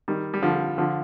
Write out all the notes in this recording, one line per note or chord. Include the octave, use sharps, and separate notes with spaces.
D#3 G3
G3
D3 F3
D3 F3